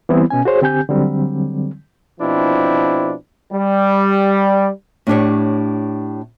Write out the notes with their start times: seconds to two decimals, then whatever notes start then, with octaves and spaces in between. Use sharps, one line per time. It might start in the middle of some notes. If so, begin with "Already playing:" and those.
0.09 E3 G3 B3 C4 E4
0.30 B2 C#4 G#5
0.45 F#4 G#4 C5 C#5
0.62 D3 C4 G4 G#5 G6
0.89 D3 F#3 G3 C4
2.20 B2 F3 C4 D4 E4
3.53 G3
5.07 A2 D4 G4 C#5